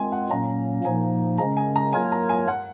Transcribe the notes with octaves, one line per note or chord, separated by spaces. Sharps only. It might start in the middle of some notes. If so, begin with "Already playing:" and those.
Already playing: G#3 C4 F4 G#5
F#5
A#2 F#3 A#3 C#4 A#5
A#2 F3 A#3 D#4 G#5
C#3 G#3 C#4 A#5
G#5
A#5
F#3 A#3 F4 A#4 C#5 G#5
A#5
G#5
F#5